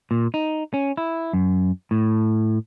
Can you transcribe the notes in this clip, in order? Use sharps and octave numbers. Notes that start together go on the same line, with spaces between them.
A#2
D#4
C#4
E4
F#2
A2